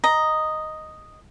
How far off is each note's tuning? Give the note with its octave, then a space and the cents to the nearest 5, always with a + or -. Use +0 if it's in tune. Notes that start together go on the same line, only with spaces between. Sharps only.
D#5 +0 A#5 +0